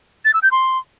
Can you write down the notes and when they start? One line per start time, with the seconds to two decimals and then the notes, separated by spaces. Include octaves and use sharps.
0.25 A6
0.34 E6
0.43 G6
0.52 C6